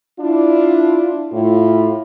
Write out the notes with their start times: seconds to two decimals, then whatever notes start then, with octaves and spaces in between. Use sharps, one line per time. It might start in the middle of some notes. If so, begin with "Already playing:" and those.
0.19 D4 E4 F4
1.32 A2 F4